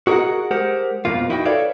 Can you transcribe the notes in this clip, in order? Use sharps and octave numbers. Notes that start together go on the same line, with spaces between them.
F#4 G#4 A#4 C5 D#5 F#5
G#3 G4 A#4 C5 F#5
F2 B2 A#3 F4
D#4 E4 F#4 D#5 F#5 G5
A4 B4 C#5 D5 E5 F5